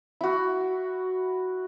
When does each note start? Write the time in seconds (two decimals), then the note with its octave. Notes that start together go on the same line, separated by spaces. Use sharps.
0.21 E4 F#4